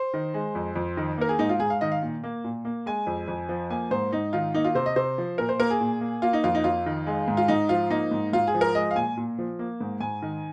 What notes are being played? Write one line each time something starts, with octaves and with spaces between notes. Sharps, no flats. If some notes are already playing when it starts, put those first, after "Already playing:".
Already playing: C5
D#3
G#3
F2
F2
D#3
A#3 A#4
G#4
G#2 D#4
F4
G#2 G#4
F5
D#3 D#5
F5
A#2
A#3
A#2
A#3
G#3 G#5
F2
F2
F3
A#3 G#5
G#2 C5
G#2 D#4
D#3 F4
A#3 D#4
F4
C3 C5
D#5
C3 C5
F3
A#2 A#4
C5
A#3 A#4
G#4
A#2
A#3
A#3 F4
D#4
F2 F4
D#4
F2 F4
D#3
G#3
G#2
F4
G#2 D#4
F3 F4
A#3 D#4
G#2
G#2 F4
G#4
F3
A#4
G#3 D#5
F5
A#2 G#5
A#2
F3
A#3
G#2
G#2 G#5
D#3